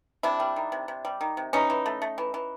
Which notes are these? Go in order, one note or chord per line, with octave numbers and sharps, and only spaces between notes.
C3 D4 E4
G3
D#3
C3
C3
G3
D#3
C3
E3 C#4 D#4
E3
A3
A3
E3
E3